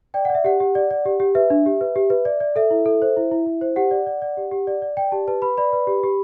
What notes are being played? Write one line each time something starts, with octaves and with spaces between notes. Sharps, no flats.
D5 G5
D5 F#5
E5
G4 F#5
G4
D5
D5
G4
G4
B4 E5
D4
G4
B4
G4
B4
D5
D5
A4 E5
E4
A4
C5
E4
E4
E4
C5
G4 F#5
D5
D5
D5
G4
G4
D5
D5
D5 G5
G4 A5
B4 A5
B4 B5
D5 B5
B4
G4
G4